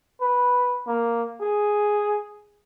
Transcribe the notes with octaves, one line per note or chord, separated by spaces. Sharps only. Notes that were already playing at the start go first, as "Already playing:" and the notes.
B4
A#3
G#4